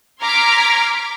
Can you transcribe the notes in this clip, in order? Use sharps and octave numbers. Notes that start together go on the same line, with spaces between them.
A#5 C6 D6 F6 G#6 B6